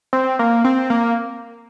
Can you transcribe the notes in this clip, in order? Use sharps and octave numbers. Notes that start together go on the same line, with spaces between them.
C4
A#3
C4
A#3